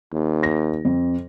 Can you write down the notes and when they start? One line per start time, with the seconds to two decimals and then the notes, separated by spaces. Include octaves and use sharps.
0.13 D#2
0.43 A#6
0.85 F2